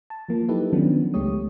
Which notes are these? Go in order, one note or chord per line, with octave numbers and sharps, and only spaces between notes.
A5
F3 A#3 F4
F#3 D#4 E4 G4 A4 B4
D#3 F3 F#3 B3 C#4 D4
C#2 G#3 A3 G4 C#5 D#6